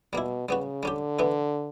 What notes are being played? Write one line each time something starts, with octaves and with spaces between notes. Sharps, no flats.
B2 G3 A#3 E4
C#3 G3 B3 F#4
D3 G3 C#4 G4
E3 B3 E4